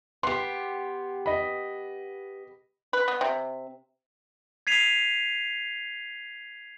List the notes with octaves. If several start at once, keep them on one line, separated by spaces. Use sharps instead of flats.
B3 G4 C6
D#5 B5
B4
B3
C3
G#6 B6 C7 D#7 F7